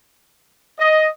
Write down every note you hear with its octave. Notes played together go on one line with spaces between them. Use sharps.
D#5